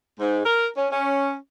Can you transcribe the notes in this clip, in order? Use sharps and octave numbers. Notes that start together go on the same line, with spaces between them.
G#2
A#4
C#4
C#4